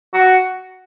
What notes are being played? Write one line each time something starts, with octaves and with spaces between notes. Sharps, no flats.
F#4